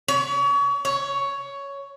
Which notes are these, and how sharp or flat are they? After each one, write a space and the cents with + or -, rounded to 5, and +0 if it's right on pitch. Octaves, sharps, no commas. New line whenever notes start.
C#5 +35
C#5 +10